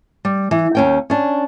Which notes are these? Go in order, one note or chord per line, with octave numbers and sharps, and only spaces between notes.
G3
E3
D#2 C#4 G5
C#4 D4